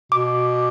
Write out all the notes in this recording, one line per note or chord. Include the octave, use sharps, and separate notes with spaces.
B2 D6